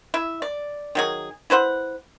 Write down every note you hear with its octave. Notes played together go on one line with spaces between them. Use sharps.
E4 E5
D5
D#3 F#3 G#4
E4 B4 C5 F#5